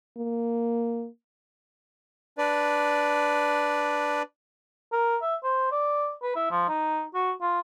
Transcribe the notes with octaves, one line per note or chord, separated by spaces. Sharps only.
A#3
D4 B4 D5
A#4
E5
C5
D5
B4
E4
F3
D#4
F#4
F4